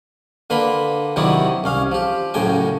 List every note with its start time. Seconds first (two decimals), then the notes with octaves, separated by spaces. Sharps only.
0.50 D3 A#3 B4 B5 C6
1.16 C3 D#3 F#3 D#4 E4 D5
1.64 C2 C#4 F5
1.91 F3 G4
2.34 F#2 A2 C#3 G5 G#5